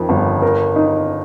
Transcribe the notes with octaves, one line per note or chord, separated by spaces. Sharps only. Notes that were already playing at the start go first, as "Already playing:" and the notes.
Already playing: F2 D#3
G1
A#4
D#4